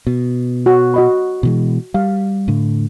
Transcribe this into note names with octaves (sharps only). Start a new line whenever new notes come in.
B2
F#4
F#4 D#5 B5
B2 E3 G#3
G3 F5
A2 D3